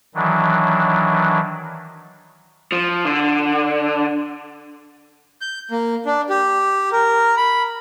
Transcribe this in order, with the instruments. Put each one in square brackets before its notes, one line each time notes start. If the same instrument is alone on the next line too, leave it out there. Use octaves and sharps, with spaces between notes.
[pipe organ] D#3 E3 F#3 D4
[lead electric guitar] F3
D3
[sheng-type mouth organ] G6
A#3
D4
G4
A#4
B5